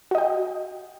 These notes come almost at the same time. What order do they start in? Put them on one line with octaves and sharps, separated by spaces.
F#4 D#5 G5